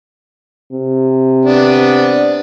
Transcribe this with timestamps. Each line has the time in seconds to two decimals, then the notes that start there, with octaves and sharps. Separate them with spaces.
0.73 C3
1.45 B3 D4